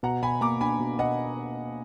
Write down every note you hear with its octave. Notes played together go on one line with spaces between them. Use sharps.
B2 F#5 A#5
B2 G#5 B5
A#3 A#5 D6
D4 G#5 B5
B2
B2 D#5 F#5